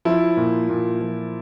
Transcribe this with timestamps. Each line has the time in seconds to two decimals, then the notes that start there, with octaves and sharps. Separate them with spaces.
0.05 F3 E4
0.37 A#2
0.69 A#2
1.01 F3